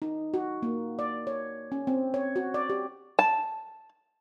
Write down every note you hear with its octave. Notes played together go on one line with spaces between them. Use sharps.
D#4
F#4
A#3
D5
C#5
C#4
C4
C#5
F#4
D5
G4
A5